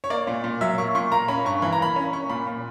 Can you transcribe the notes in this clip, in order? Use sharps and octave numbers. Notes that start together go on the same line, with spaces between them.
C#5
A#3 D5
A#2
A#2
F#3 E5
A#3 C#6
A#2 C#6
A#3 A#5
C#4 B5
G2 C#6
E3 B5
A#5
A#3 B5
C#4
C#4 C#6
A#2 B5
A#2